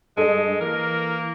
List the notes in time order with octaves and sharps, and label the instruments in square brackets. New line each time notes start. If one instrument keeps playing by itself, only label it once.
[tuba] G2 [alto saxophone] G#3 [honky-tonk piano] A4 D#5
[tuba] E3 [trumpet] A#3 [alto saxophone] A#4